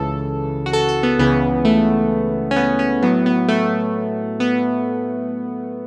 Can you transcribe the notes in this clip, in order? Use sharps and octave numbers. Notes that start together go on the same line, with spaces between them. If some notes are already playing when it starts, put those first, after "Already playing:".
Already playing: C#2 C#3 E3 A4
F#4
A4
A4
B3
C#2 C#3 E3 B3
A3
C#4
B3
C#4
A2 F#3 B3
B3
A3
B3